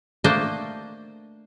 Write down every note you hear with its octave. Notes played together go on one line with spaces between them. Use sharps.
A3 A#3 D4 C5 D#5